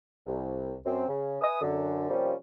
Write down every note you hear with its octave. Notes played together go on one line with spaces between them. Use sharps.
C2
F#2 C4
C#3
B4 E5 G#5 D#6
F#2 D3
C3 F3 G3 A#3 C4 C#4